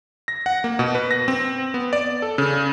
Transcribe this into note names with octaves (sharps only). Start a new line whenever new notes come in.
A#6
F#5
A#3
B2
B4
A#6
C4
B3
D5
A4
C#3